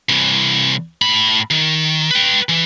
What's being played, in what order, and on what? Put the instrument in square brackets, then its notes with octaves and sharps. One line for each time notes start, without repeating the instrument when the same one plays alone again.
[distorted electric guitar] C2 E3
A2 B5
D#3
B4 G5
E3